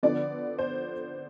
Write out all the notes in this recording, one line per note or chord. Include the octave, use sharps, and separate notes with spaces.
D3 F3 B3 D4 D5
C5